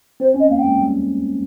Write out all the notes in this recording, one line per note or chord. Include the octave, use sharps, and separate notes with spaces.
C4 C5
C#4
D#5
A#3 F5
G5
G#3
G3